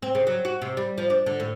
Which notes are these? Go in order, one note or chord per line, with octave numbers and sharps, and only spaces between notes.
C4
C#3
F#3
F#4
C3
G3
F3
D4
D3
A2